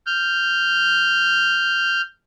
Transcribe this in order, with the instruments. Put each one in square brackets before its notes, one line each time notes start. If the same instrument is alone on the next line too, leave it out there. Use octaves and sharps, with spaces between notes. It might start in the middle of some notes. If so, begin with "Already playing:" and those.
[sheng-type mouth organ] F6 G6